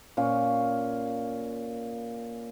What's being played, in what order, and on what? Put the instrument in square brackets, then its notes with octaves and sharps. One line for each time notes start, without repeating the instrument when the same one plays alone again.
[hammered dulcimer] A#2 C#4 F5 C#6